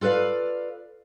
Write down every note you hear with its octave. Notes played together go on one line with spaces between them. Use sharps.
F4 A4 B4 D5 F5